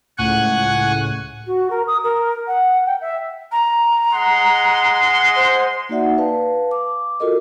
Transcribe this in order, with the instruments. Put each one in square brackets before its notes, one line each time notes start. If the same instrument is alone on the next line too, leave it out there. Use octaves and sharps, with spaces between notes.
[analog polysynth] C#2 A2 F#6 [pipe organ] F#5 G#5 C#6
[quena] F#4
A#4
D#6
A#4
F#5
G5
E5
[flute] A#5
[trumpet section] G#3 F#5 C6
[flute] C5
[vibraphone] A#3 D#4 F#4 D5 E5 F#5
B4 F5 A5
D6
F4 F#4 A4 A#4 D#5